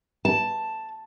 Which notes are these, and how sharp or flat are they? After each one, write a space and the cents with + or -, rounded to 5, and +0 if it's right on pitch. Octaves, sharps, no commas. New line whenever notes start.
A5 +5